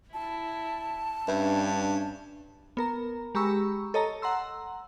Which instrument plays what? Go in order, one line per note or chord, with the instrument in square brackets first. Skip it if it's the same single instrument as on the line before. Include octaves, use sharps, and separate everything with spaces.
[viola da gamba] E4 [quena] A5
[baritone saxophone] G2 [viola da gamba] C#4 D4 [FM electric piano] B4 E5
[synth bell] B3 A#4 A#5
G#3 G4 A#5 B5 C#6 E6
A4 C#5 D#5 A5 A#5
F#5 A#5 C6 E6